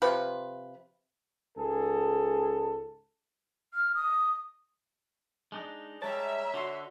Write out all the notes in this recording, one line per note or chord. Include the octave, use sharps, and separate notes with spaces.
C3 F3 B4
C#2 G#2 G#4 A4
F6
D#6
G#3 D4 D#4
G3 G#3 C#5 E5 A5 A#5
D3 F#4 C6